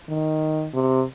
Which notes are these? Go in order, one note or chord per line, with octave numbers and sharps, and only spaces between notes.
D#3
C3